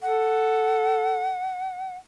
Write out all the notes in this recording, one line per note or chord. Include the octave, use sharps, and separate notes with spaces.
A4 F#5